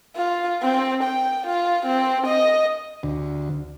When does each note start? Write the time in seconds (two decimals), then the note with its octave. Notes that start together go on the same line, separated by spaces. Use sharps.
0.16 F4
0.62 C4
1.03 G5
1.46 F4
1.86 C4
2.26 D#5
3.03 D2